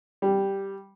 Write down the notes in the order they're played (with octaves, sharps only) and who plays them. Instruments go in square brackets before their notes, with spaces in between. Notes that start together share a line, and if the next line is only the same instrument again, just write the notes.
[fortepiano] G3